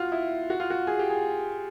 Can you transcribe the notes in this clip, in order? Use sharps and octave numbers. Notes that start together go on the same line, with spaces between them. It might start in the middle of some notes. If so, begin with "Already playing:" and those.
Already playing: F4 F#4
E4
F#4
F4
F#4
G#4
G4
G#4